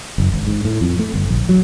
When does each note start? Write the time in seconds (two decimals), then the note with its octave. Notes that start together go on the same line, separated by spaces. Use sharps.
0.18 F#1
0.34 G#1
0.47 G#2
0.65 A2
0.81 F2
0.99 A3
1.14 G1
1.29 A#1
1.49 F#3